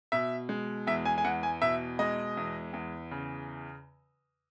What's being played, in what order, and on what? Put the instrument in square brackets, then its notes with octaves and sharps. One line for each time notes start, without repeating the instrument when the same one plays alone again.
[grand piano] B2 E5
G#3
E2 E5
G#5
G#5
E2 F#5
G#5
B2 E5
G#3 D#5
E2
E2
C#3